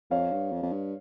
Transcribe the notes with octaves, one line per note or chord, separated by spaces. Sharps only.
F2 C#5 F5
G2
F2
F2
G2